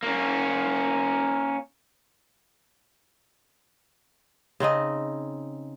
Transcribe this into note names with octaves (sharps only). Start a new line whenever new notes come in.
A#3 C#4
C#3 C4 D#4 D#5